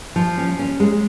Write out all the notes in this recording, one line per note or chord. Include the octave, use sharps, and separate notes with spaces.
F3
C#4
C#4
G#3